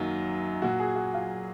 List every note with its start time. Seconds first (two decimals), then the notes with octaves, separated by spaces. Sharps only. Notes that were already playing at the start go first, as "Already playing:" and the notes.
Already playing: F#2 D#3 F#3 A#3
0.62 A#2 F#3 F#4
0.80 G#4
0.96 F#4
1.14 F4